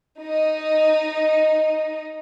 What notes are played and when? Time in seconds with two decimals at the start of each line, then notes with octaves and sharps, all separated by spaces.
0.20 D#4 D#5